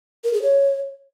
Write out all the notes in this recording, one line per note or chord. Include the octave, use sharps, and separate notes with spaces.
A#4
G#4
C#5